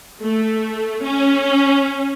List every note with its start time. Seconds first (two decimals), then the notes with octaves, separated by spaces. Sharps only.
0.24 A3
1.04 C#4